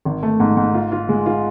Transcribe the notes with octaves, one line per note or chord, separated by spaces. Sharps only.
G#1
A3
G#2
G#2
F4
F4
G#3
F4